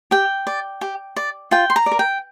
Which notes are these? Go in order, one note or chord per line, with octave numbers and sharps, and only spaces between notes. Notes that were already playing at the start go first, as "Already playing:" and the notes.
G4 G5
D5
G4
D5
F4 G5
C6
A#5
D5
A#4
G5